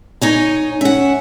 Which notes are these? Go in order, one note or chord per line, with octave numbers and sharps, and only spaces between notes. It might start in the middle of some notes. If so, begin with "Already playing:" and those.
D#4 C#5 G#5
C#4 E5 F#5